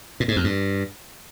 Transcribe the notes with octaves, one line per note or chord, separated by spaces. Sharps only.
A#2
G#2
F2
G2